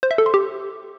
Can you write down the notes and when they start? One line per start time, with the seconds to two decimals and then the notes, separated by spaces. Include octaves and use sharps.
0.03 C5
0.11 E5
0.18 A4
0.26 C6
0.34 G4